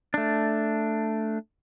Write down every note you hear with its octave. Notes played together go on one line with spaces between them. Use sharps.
A3 D4